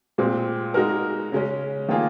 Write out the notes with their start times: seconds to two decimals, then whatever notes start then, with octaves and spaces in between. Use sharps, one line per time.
0.18 A#2 G#3 C4
0.74 G#3 D#4 F#4 A#4
1.32 C#3 G#3 C#4
1.88 D#3 A#3 F4 G#4